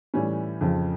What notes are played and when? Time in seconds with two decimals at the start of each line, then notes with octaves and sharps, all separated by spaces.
0.14 A2 E3 G3 C#4
0.61 F2 C#3 F3